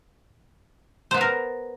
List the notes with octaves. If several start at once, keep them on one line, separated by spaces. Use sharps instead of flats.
B3 A#4 C5 F5